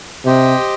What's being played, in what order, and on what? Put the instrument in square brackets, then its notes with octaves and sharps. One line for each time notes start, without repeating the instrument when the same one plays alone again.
[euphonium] C3 [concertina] G4 C5 D#5 G5